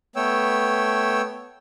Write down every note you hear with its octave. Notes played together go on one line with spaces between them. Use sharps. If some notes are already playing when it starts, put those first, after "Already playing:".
A3 B3 C#5 G5 E6